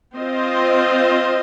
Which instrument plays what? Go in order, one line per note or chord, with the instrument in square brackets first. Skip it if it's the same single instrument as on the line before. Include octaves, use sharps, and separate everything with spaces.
[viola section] C4 F4 C5 D#5